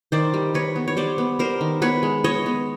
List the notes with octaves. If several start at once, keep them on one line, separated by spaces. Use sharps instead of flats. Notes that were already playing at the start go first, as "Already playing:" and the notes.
D#3 C5 D5
G3
D#3 B4 C#5
B3
C#5
G3 C5 D5
B3
G3 A#4 C5
D#3
B3 B4 C#5
G#3
B3 C#5 D#5
B3